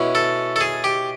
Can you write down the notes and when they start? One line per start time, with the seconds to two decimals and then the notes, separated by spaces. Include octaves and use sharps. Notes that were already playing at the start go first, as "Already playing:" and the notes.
Already playing: B2 G#3 C#4 E4
0.15 A4
0.56 A4
0.61 G#4
0.84 G4